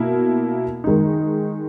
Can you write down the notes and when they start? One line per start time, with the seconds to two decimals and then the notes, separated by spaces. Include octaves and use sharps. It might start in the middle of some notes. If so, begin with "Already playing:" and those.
Already playing: B2 A#3 E4
0.84 D#3 G#3 D#4